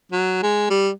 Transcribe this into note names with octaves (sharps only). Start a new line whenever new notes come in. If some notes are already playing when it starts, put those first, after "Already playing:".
F#3
G#3
G3